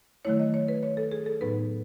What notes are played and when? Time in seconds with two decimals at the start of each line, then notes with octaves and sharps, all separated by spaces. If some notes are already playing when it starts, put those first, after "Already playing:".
0.25 D#3 F#3 A3 E4 C#5
0.39 D#5
0.54 C#5
0.68 B4
0.83 C#5
0.97 A4
1.12 G#4
1.26 A4
1.41 A2 F#3 B3 D#4 B4